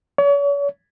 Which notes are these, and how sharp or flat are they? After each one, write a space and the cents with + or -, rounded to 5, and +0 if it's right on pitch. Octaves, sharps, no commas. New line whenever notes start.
C#5 +40